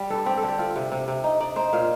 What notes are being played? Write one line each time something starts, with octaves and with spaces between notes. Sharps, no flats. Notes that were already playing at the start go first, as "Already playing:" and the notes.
Already playing: G3
G2 A4
C4 G4
A4
D3
G4
C4 F4
C3
C3
C3
D#4
D#4 D5
D#4 C5
A#2 F5